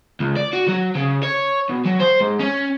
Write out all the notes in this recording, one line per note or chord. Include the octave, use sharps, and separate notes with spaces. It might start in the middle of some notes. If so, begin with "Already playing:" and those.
C#2
D5
F#4
F#3
C#3
C#5
B2
F#3
C5
G#2
C#4